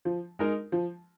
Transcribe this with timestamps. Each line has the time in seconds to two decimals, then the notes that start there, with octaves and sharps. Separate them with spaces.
0.05 F3
0.39 G#3 D#4 A#4
0.72 F3